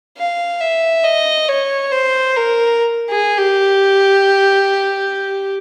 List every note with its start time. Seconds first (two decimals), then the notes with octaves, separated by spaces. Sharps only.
0.18 F5
0.61 E5
1.04 D#5
1.49 C#5
1.92 C5
2.37 A#4
3.10 G#4
3.38 G4